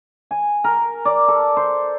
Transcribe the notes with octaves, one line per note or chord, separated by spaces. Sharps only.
G#5
A#4
D5
A4
C5